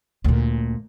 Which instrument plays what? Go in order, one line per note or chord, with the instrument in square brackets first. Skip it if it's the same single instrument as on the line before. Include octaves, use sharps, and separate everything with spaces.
[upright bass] D2 A#2